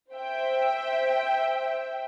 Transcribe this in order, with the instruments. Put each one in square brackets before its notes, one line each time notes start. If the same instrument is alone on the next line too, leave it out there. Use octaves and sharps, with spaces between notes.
[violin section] C5 E5 G5